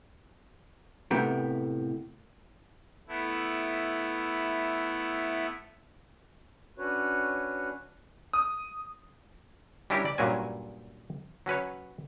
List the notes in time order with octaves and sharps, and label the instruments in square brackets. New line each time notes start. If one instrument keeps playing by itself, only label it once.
[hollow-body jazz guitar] A2 C3 A3 B3 G4 A#4
[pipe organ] A3 B3 E4
[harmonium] C#4 D4 F#4 B4 C#5
[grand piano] D#6
[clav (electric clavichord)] G3 C#4 D4 E4 G4 A#4
D5
G2 A#2 F#3 C#4 F#4 G#5
F#3 C#4 B4 C#5